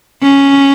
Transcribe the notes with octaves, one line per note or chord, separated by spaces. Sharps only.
C#4